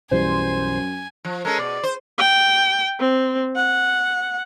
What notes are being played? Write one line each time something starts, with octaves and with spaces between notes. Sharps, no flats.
B1 F#2 E3 G3 C5 G#5
F3
G#3 C#4 A4 A#4
B2 D5
C5
G5
C4
F#5